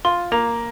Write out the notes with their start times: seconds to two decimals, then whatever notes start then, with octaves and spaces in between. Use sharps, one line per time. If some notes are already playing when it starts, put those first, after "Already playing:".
0.05 F4 C6
0.32 A#3 A#5